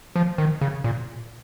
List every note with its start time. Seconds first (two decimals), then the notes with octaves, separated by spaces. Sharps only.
0.16 F3
0.38 D#3
0.61 C#3
0.84 A#2